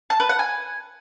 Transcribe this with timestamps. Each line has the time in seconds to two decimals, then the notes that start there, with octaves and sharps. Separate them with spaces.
0.10 A5
0.20 B4
0.29 F#5
0.39 G#5